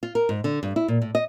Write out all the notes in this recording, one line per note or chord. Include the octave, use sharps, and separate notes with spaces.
F4
A#4
G#2
D3
G2
E4
A#2
A2
D#5